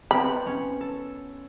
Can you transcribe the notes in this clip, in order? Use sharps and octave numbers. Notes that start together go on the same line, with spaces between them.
B3 C4 B5
C#4
A4